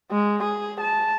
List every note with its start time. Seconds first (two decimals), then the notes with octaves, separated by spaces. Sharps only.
0.11 G#3
0.43 G#4
0.81 A5